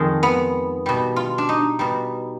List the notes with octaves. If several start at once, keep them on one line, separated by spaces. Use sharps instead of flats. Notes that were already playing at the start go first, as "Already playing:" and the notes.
Already playing: F2 D#3 G#3
B3
B2 G3
F4
D4
D#4
B2 G3